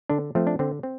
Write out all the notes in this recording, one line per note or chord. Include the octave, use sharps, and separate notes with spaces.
D3 D4
F3 A3 C4
D4
D3 C4
C4